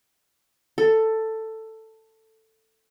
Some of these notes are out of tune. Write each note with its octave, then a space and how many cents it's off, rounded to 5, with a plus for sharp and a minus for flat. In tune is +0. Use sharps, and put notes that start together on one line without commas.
A4 +10